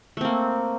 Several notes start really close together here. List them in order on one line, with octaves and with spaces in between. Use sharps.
A3 C4 A#3